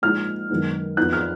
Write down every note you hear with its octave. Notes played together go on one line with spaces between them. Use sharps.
A#2 F3 G#3 D#4 F6
F#2 D#3 G#3 B3 D#4
F2 F3 B3 D#4 F#6
F6